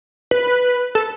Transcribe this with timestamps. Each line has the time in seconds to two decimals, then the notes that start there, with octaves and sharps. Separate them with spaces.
0.31 B4
0.95 A4